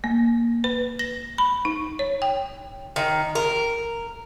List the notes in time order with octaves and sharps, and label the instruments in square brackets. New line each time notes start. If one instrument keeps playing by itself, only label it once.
[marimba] A#3
B4
A#6
B5
D#4
C#5
G5
[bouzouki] D#3
A#4